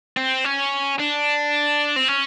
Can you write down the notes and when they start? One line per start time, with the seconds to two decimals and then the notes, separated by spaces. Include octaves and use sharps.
0.17 C4
0.44 C#4
0.99 D4
1.96 C4
2.08 C#4